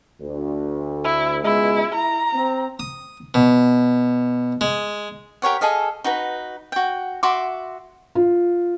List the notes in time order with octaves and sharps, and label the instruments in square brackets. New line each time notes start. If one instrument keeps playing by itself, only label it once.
[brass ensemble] D2
[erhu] E4
[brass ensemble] C#2 B2 G#3 [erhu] E4
[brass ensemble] E4 [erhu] A#5
[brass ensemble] C4
[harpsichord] D#6
B2
G#3
[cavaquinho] G4 A#4 C#5 F#5
G#4 A4 D#5 F5
D#4 F#4 B4
F#4 G5
F#4 E5 C6 D6
[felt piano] F4